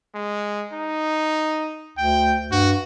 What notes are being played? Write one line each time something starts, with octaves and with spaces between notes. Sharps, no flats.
G#3
D#4
D2 G5
G2 F#4